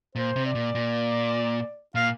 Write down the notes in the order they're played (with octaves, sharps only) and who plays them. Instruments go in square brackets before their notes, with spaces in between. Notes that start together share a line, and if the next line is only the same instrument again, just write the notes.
[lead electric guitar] A#2 [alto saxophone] C5
[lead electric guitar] C3
[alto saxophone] D5
[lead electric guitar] A#2
A#2
[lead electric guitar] A#2 [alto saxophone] F5